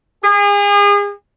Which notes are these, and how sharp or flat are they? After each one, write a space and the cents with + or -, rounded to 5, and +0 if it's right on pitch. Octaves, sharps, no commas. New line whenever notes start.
G#4 -35